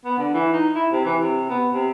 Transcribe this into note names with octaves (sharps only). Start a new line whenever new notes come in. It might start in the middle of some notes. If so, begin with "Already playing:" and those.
B3
D3
E3
D#4
E4
C3
E3
C3
B3
C3